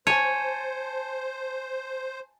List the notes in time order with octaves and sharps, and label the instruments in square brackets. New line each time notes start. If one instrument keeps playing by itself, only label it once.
[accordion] C5 [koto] C#5 [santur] G#5 A5 [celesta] G#6 C#7 D#7